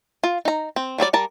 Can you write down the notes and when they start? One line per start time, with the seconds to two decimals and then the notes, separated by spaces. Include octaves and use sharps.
0.24 F4
0.45 D#4 A#5
0.76 C4
0.98 F#3 G3 G#4 D5
1.13 G3 A#4 A5